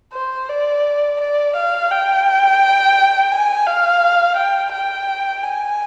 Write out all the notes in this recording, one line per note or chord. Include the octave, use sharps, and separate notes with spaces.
C5
D5
D5
F5
G5
G#5
F5
G5
G5
G#5